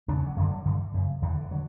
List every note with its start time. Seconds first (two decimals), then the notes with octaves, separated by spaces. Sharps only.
0.08 E2 C#3 D4
0.18 C#4
0.26 F#3
0.36 F#2 D3 E3
0.51 F#3
0.65 G2 D3 E3
0.94 F#2 C#3
1.22 E2 C#3 E3
1.32 D3
1.41 E3
1.51 D3 F#3